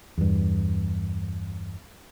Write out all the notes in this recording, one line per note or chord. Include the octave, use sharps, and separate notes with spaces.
E2 G2